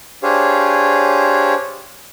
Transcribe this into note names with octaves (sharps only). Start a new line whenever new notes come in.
D4 G4 G#4 C5 C#5 F5